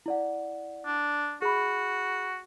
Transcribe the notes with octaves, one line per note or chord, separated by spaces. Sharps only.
E4 D5 F#5
D4
F#4 G#4 B5